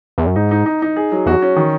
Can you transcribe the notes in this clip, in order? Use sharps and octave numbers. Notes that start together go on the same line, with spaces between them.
E2
F#2
G#2 D#4
D#4
D#4
D#4
G#4
F#3
E2 F#4
C#4
D#3